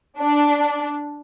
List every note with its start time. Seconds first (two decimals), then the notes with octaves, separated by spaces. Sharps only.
0.20 D4